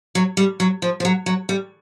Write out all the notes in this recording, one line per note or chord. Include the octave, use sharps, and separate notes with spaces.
F#3
G3
F#3
F3
F3
F#3
F#3
G3